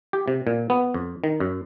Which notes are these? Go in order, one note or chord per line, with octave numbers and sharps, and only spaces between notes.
G4
C3
A#2
B3
F2
D#3
F#2